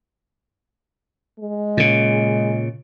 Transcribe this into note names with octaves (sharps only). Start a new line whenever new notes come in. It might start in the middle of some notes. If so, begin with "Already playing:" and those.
G#3
A#2 C#3